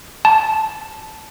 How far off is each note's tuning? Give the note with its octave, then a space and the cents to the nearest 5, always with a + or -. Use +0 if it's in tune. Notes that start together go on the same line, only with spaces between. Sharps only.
A5 -10